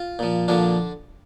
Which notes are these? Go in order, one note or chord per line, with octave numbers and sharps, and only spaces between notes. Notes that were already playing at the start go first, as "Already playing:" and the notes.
Already playing: F4
A#2 F3
A#2 D3 F3 D4